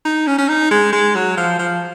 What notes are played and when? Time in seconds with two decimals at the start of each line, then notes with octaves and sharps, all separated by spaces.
0.05 D#4
0.27 C#4
0.38 C#4
0.49 D#4
0.71 G#3
0.93 G#3
1.15 F#3
1.37 F3
1.59 F3